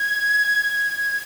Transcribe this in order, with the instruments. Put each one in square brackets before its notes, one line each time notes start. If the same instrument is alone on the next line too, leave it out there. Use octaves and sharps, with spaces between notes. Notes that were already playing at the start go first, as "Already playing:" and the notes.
Already playing: [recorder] G#6